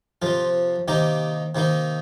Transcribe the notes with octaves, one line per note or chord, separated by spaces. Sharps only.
F2 C3 F3 F4
C3 D#3 A#3 D#4 G4
C3 D#3 A#3 D#4